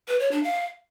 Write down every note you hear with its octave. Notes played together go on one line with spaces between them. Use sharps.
B4
C#5
D4
F5